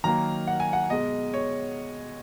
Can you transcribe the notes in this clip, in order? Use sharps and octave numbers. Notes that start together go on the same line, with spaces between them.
D#3 F#3 A#3 A#5
F#5
G#5
F#5
B2 G#3 D#5
C#5